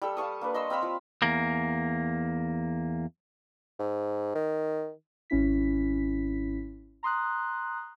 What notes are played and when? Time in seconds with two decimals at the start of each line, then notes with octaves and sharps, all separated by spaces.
0.02 G3 A4 E6
0.17 F5 A5 C#6 D#6
0.41 A#3 D4 B4
0.54 D#5 C6 C#6 E6
0.70 C4 F5 B5 E6
0.82 F3
1.22 E2 A#3
3.79 G#2
4.35 D#3
5.30 G#1 C#4 E4 B6
7.03 A#5 C6 D#6 F#6